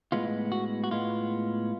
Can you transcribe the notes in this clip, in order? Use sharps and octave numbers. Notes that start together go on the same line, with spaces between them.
A2 G#3 B3 F4
F#4
F#4
A2 G#3 B3 F4